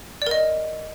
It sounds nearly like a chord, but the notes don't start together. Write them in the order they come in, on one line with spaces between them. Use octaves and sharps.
D5 A#4 D#5